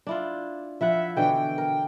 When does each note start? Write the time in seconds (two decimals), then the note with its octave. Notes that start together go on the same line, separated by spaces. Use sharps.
0.07 D4 E4 F4
0.81 F3 E4 E5 F#5
1.16 B2 D3 E3 G5
1.58 A#4